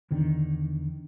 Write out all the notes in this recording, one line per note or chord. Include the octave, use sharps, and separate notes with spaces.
E2 D3 D#3